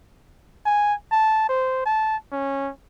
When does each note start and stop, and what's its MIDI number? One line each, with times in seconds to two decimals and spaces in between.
0.66 0.94 80
1.12 1.47 81
1.49 1.82 72
1.86 2.17 81
2.32 2.70 61